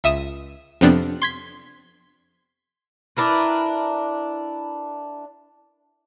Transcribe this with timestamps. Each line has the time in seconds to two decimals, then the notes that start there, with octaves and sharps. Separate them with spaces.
0.04 C#2 E5 D#6 E7
0.81 F2 C3 F3 B3 C4 D4
1.22 C6 G#6 B6
3.17 D4 E4 A#4 B4